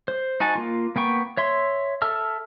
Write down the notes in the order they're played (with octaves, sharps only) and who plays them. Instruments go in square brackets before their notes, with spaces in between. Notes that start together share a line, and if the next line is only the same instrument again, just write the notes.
[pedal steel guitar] C5
D#4 F#4 G#5 A5
A#3 F4
A#3 B3 G5 C#6
C#5 E5 C6
A4 E5 A5 E6 F6